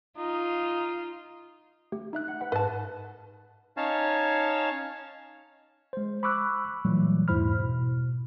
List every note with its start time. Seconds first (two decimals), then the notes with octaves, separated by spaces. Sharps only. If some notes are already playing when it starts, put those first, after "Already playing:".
0.17 D#4 F4
1.92 A3 G4
2.13 D#4 E5 F#6
2.28 F#5
2.41 B4 F#5
2.52 G#2 B4 A5
3.77 C#4 D#4 C#5 F5 A5
5.93 G#3 C5
6.23 B5 C#6 D6 E6 F#6
6.85 A#2 E3 F#3 G3 A3
7.28 E2 G#2 E4 C5 B5 F6
7.58 B2